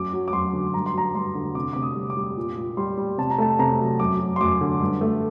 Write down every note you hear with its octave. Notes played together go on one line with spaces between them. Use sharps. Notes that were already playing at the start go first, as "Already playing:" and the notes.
Already playing: F#2 F#3 D6
F#3
D6
F#2 C6
D3
G2 A#5
C6
F#3 A#5
G2 C6
D3
C3 D6
C3 D6
D#6
G3
D6
G3
A#2
A#2
G3 C6
G3
C3 A5
A#5
A3 A5
C3 A#5
F#3
F#2 D6
F#3
C6
F#2 D6
D3
G2
A3